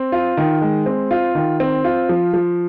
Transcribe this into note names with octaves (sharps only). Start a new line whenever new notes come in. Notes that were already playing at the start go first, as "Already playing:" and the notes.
Already playing: C4
F4
D#3
G#3
C4
F4
D#3
C4
F4
F3
F3